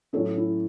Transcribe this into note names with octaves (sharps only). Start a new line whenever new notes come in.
A2 F#3 C#4 A4 C#5
E4